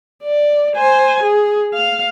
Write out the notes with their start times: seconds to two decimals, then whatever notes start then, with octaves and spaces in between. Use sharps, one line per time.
0.23 D5
0.76 C5 G#5
1.23 G#4
1.74 F5